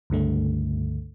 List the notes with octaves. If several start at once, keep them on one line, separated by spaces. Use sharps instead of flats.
C#2 G2 D3 A3